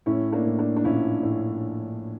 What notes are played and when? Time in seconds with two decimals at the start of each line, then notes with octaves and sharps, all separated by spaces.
0.06 A2 C#4 E4
0.32 A#3 D4
0.46 A2
0.59 A#3 D4
0.76 D4
0.84 A#1 C#4 E4
1.23 A2